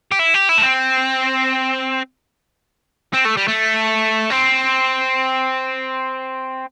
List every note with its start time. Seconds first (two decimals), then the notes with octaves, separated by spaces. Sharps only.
0.12 G4
0.19 E4
0.34 G4
0.49 E4
0.58 A3
0.63 C4
3.13 C4
3.25 A3
3.37 G3
3.48 A3
4.30 C4